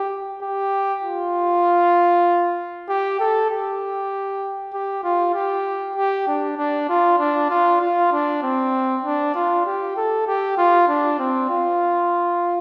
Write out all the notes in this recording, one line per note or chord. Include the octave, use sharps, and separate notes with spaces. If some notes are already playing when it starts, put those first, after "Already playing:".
Already playing: G4
G4
F4
G4
A4
G4
G4
F4
G4
G4
D4
D4
F4
D4
F4
F4
D4
C4
D4
F4
G4
A4
G4
F4
D4
C4
F4